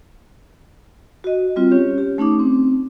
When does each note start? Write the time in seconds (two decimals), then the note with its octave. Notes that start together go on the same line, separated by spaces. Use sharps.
1.24 F#4 D#5
1.56 G3 C4 F4
1.71 C#4 G4 C#5
1.98 G4
2.18 A3 C#4 D#4 D6
2.39 C4